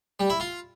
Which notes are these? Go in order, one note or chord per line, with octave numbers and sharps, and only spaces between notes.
G3
E4
F4